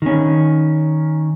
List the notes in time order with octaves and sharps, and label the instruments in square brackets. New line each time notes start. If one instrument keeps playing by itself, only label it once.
[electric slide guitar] D#3 C#4